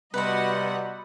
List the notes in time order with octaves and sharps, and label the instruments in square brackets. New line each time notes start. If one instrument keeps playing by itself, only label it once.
[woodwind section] C3 G3 [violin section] B3 F#4 F#5 [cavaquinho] B4 B5 [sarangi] D#5